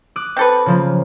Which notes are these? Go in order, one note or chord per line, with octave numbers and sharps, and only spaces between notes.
D6 D#6 F#6
C4 A4 B4
C#3 F3 A#3